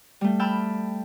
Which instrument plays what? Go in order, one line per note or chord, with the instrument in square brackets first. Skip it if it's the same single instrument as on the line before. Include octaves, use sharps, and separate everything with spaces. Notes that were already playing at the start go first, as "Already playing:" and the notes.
[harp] G3 A3
G5 A5 B5 E6 F6